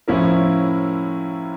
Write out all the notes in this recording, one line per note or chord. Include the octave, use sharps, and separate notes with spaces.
A2 F3 C#4 E4 A#4